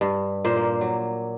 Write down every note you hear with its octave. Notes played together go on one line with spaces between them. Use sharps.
G2
A#2 C5
A#3
F#3